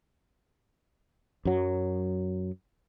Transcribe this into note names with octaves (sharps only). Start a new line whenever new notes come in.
F#2 F#3